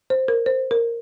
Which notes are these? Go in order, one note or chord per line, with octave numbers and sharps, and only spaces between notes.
C5
A#4
C5
A#4